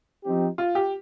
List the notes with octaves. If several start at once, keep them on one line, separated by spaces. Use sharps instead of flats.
F3 C4 D#4 G4
F4
G4